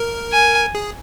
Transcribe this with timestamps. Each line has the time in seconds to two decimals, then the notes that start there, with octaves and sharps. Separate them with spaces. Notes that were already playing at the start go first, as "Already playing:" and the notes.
Already playing: A#4
0.33 G#5
0.75 G#4